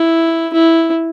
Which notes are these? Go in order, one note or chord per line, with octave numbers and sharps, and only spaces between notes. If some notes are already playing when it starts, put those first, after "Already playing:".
Already playing: E4
E4